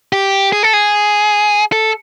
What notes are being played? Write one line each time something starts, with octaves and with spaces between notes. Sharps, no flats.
G4
G#4
A4
G#4
A4